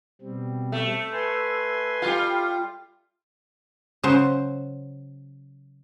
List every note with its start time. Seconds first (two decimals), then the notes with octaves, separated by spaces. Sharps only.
0.22 B2 G3 C4
0.72 A3
1.12 B4 G#5 C6
2.02 G3 F4
4.03 C#3 F#3 C5